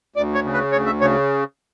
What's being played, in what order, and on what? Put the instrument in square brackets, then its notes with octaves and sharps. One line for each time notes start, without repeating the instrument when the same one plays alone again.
[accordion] D2 D5
C#5
C#3
B4
D2 C#5
E5
C#3 C#5